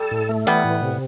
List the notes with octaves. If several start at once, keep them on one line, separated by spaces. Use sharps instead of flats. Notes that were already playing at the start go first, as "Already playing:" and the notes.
Already playing: G3 A4
A2
A3
E3 G3 B3
A2
C3